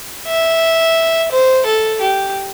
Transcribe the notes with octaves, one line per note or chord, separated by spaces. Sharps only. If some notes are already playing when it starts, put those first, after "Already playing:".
E5
C5
A4
G4